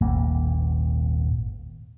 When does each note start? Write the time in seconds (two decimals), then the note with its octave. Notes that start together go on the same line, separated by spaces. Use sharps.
0.01 D#1 G#1 A#3